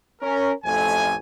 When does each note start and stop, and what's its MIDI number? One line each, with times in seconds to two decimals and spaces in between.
0.22 0.52 61
0.22 0.52 70
0.65 1.15 33
0.65 1.15 41
0.65 1.15 57
0.65 1.15 80